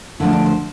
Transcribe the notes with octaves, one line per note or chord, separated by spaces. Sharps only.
D3 F3 A3 E4
D4
C5